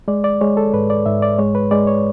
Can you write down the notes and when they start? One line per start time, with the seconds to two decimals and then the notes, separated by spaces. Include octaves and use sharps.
0.08 G#3 D5
0.24 D5
0.41 G#3 C#5
0.57 A4
0.74 G#2 B4
0.90 D5
1.06 G#2 E5
1.22 D5
1.38 G#3 C#5
1.55 B4
1.71 G#3 D5
1.87 C#5